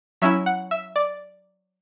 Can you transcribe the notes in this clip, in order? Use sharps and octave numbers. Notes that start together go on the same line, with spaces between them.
F#3 C#4 E4 E5
F#5
E5
D5